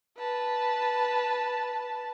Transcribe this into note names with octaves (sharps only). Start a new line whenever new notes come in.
B4 A5